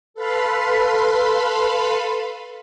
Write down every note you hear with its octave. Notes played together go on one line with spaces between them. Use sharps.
A4 B4 F5 B5 C6